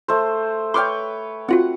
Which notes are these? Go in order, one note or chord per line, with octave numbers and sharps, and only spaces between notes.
A3 C5
B4 C#5 G5 C6 D6 F6
C4 F4 F#4 F#5